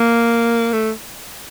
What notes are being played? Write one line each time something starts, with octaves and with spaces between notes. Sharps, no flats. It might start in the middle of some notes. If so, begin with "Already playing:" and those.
Already playing: A#3
A3